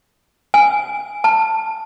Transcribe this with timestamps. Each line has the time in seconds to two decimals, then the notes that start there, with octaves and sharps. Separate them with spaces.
0.54 G#5
1.24 A5